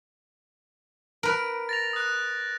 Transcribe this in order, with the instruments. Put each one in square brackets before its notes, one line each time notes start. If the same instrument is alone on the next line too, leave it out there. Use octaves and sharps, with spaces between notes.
[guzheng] A#4 B4 [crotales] D7
[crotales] A6 A#6 F7
D#6 F#6